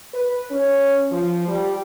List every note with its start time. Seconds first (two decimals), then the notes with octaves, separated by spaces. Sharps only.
0.13 B4
0.49 C#4
1.11 F3
1.47 G3